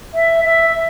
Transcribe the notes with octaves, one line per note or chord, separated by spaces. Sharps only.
E5
E5